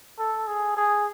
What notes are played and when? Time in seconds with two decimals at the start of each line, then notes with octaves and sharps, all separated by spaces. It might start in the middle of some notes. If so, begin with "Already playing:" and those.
0.19 A4
0.47 G#4
0.77 G#4